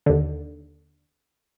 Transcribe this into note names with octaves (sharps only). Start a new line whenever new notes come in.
D#2 D3